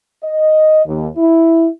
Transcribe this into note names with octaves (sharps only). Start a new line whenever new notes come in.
D#5
D#2
E4